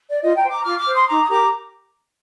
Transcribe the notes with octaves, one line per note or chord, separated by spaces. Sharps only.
D5
F4 D#5
G5 A#5
C5
A#5 D6
F4 D6 F6
D6 F6
C5
C6 D#6
D#4 A#5 D6
D#6
G4 A#4 A#5 D6